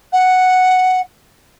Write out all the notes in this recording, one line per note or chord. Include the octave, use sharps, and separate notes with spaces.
F#5